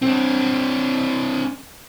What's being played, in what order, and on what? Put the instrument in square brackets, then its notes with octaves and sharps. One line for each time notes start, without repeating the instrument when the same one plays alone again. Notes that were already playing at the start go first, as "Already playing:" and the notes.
[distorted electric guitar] C4 D4